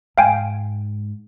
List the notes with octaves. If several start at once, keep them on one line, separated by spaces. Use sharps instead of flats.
G#2 F5 G5 G#5